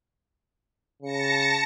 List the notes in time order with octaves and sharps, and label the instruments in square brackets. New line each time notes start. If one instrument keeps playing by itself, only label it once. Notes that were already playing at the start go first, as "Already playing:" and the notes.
[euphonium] C#3 [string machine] A5 A#6 C#7